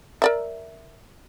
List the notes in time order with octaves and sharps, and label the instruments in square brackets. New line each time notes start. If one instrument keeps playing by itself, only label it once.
[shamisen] A#4 D5 E5